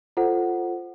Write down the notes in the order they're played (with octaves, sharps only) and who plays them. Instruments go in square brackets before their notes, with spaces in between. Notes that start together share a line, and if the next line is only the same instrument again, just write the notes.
[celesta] F4 A4 C5 F#5